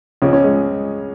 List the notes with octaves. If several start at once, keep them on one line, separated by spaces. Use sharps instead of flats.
C#2 C#3 F3 C#4
C#4
G#3